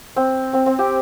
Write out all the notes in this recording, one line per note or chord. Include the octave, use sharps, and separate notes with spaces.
C4
C4
C4
G4